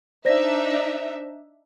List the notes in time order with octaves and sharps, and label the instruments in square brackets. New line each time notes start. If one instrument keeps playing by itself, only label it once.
[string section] D4 D#4 E5 [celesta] C5 D5 A#6